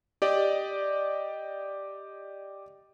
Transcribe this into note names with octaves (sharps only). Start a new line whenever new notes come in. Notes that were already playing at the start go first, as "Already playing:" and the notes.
G4 D5 D#5